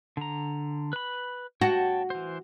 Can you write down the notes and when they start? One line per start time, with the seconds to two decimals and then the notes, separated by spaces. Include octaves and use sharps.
0.17 D3 A#5
0.93 B4 B5
1.61 F#4 C#5 G5 A5
2.10 E3 C5